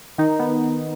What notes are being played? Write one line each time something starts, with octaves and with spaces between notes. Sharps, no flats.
D#3 D#4
B3